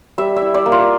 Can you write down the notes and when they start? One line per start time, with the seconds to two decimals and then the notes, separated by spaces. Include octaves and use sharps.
0.18 G3 E5
0.36 E5
0.42 E4
0.54 D5
0.66 A#3
0.72 F4